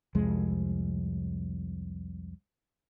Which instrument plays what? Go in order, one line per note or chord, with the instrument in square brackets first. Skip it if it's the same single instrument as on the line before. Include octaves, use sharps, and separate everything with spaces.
[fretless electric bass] C2 F2 G#3